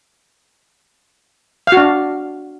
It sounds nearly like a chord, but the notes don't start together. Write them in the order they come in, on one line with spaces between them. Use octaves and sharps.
F5 F#4 D4